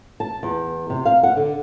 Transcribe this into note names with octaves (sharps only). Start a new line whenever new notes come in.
A5
E2
C3
F5
F#5
D3